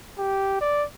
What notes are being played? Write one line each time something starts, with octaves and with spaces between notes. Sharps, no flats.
G4
D5